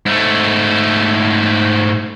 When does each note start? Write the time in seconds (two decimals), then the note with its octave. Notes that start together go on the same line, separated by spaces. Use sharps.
0.06 G#2 A3